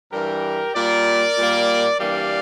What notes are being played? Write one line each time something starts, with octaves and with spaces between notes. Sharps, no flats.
G2 E3 G3 G4 A#4
A#2 G3 A#3 A#4 D5
A#2 G3 A#3
G2 E3 G3 A#3 D5 F5